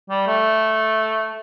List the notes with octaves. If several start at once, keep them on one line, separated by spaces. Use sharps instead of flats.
G3
A3